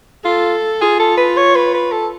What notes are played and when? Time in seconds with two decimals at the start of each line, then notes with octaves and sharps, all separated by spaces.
0.25 F4 A4
0.81 F4 G#4
1.00 A4
1.17 B4
1.37 C#5
1.55 B4
1.74 B4
1.92 A4